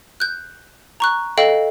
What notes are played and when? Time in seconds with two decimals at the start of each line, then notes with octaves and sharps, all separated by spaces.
0.20 F#6 G6
1.00 A#5 C#6 F#6
1.38 A4 D#5 F5 G5